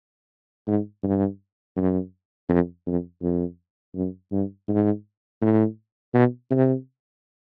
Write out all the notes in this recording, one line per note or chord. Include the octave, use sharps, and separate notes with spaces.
G#2
G2
F#2
F2
F2
F2
F#2
G2
G#2
A2
B2
C3